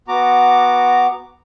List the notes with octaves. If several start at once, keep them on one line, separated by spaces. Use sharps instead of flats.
B3 F#4 A#5 D6